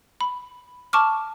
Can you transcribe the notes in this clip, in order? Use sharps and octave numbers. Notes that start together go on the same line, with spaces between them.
B5
A5 C#6 D6 F6